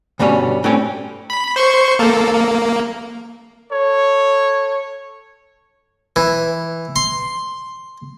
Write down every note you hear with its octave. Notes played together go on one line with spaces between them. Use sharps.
D2 G2 B2 G3 C#4
A2 G3 C4 C#4
B5
C5 C6 C#6
A#3 A4
A#3
A4 C#5
E3
C6